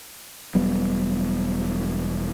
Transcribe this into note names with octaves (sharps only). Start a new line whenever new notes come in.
E1 F#3 G3 B3